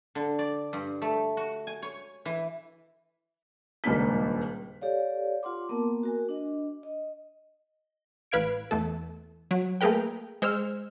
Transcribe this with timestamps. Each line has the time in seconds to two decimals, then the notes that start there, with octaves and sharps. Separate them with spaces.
0.15 D3
0.39 D5
0.73 G2
1.02 A3
1.37 F#4
1.67 G#5
1.82 C#5
2.25 E3
3.84 D#1 C#2 A#3 D4 B6
4.81 G4 A4 C#5 D5 F5
5.43 F4 F#5 C6 D6
5.69 A#3 B3 A#4 A5
6.03 F#4 A#4 G#5
6.29 D4 D#5
6.83 D#5
8.32 A1 B4 F5 G#6 D7
8.71 E2 A3 A4
9.51 F#3
9.81 A3 A#3 G#4 A#4 B4 G5
10.42 G#3 C5 E6 F6